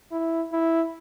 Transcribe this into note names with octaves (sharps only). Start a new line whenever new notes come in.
E4
E4